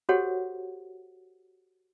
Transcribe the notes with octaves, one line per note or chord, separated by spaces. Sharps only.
F#4 G4 A4 C5 C#5 F#5